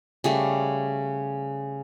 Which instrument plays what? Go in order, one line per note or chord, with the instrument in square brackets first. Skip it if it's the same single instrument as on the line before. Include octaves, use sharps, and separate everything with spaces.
[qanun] C#3 G3 A3